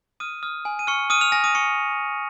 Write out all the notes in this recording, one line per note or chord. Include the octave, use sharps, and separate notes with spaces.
D#6 F6 D#7
D#6 F6 D#7
G#5
D#7
C#6 F6 C#7
D#6 F6 D#7
F6 F7
G#5 A#6
D#6 D#7
C#6 F6 C#7